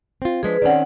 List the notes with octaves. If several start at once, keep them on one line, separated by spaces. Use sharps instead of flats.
C4 F4
F3 G#3 D4 G#4 B4
D#3 C4 C#4 D5 F#5